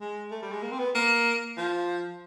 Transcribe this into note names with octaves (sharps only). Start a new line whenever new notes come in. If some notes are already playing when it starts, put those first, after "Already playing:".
G#3
A3
G3
G#3
A#3
C4
B3
A#3
F3